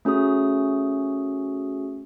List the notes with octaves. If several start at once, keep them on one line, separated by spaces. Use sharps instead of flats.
A3 C#4 F#4 G#4 D#6